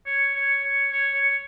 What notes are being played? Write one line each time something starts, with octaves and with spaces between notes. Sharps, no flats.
C#5
C#5
C#5
C#5
C#5